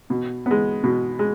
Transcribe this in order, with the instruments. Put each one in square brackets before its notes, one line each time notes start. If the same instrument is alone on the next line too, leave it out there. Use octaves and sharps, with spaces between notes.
[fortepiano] B2
G#3 B3
B2
G#3